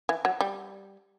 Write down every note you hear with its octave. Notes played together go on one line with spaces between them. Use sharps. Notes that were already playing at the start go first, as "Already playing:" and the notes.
E3
F#3
G3